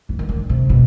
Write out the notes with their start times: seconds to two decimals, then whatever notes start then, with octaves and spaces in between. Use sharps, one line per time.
0.09 E3
0.19 D#3
0.29 D3
0.49 C3
0.69 B2